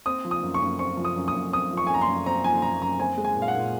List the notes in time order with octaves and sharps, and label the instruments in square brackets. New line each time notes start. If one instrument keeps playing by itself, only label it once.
[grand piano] C4 D#6
F3
D#6
F#2
C#6
F#2
C4 C#6
F3
D#6
F#2
D#6
F#2
C4 D#6
F3
C#6
G#5
F#2 A#5
C6
F#2
C4 A#5
F3 G#5
F#2 A#5
F#2 A#5
C4 G#5
G#3
G#5
A#2
F5
F#5
A#2